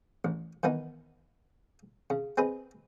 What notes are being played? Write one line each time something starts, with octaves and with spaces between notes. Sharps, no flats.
A1
D#3 E3 B3 D#4
C#3
C4 G#4 B4 D#5